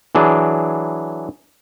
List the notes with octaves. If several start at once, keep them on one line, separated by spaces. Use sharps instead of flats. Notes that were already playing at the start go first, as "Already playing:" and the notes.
E3 F#3 D4 G#4